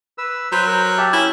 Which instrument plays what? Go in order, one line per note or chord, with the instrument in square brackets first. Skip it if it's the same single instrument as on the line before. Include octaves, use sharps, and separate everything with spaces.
[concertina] B4 E6
[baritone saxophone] F#3 [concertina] B4 C5
[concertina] A#4
G4 E5 A5
[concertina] C#4 [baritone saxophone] E4